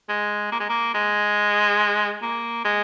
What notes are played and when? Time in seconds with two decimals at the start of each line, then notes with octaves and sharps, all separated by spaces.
0.09 G#3
0.52 A#3
0.60 G#3
0.70 A#3
0.94 G#3
2.22 A#3
2.65 G#3